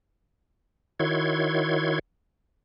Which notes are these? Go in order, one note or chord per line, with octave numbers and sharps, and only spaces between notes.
D#3 E4 F#4 C#5 C6 G#6